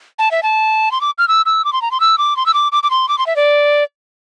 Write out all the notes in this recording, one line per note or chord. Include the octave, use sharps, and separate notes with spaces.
A5
E5
A5
C6
D6
F6
E6
E6
D6
C6
A#5
C6
E6
D6
C6
E6
D6
D6
D6
C6
D6
C6
E5
D5